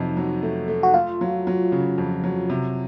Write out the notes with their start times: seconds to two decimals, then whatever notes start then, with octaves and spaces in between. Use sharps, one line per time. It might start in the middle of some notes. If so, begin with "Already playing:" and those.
Already playing: F2 C3 F#3 D#4
0.17 F#3
0.43 A3
0.68 A3
0.83 F#4
0.94 A3 F4
1.21 F#3
1.47 F#3
1.72 C#3
1.98 F2
2.24 F#3
2.50 C3